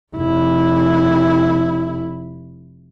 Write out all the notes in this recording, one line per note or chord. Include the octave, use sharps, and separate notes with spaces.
F1 E4